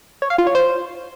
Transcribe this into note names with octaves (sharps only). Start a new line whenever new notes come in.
C#5
F5
F4
C#5
C5